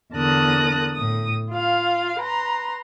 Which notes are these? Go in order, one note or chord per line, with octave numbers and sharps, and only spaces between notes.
E2 D3 A#4 A5 D#6 F#6
A2 D#6
F4 F5
B4 A#5 C6